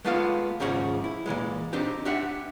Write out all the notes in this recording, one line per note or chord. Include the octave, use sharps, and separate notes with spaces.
G#3 A3 B3 F4 D5 F5
D#2 G#2 C#3 F3 C#4 G#4
E4
A#2 C#3 E3 G#3
C4 D4 D#4 G4 G5
D4 G4 E5 F#5